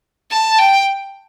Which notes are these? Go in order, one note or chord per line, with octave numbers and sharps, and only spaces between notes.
A5
G5